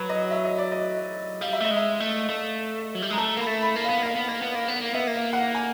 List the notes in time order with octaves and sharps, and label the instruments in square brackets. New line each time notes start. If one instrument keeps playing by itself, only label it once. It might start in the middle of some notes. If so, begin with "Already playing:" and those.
Already playing: [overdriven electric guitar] F#3 [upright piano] B4
[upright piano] D#5
E5
D#5
D5
D#5
[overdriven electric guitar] G3 [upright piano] F5
[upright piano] E5
[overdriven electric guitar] A3 [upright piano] D#5
[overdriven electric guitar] G#3
[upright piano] E5
[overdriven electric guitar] A3
A3
F#3
G3
[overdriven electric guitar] G#3 [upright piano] A#5
[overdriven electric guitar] A3 [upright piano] A5
[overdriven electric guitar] A#3 [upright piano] B5
[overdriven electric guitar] A3
[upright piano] B5
[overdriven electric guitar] A#3
[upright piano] F5
[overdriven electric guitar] B3
[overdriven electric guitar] A#3 [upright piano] F5
[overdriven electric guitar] B3
A#3
B3
A#3
B3
A#3
[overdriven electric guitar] B3 [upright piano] E5
[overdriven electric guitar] A#3
[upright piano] F5
F#5
F5
G#5